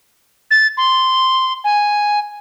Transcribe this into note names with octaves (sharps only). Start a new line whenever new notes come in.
A6
C6
G#5